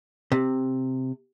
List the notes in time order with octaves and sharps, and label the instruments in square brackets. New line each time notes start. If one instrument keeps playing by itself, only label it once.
[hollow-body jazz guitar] C3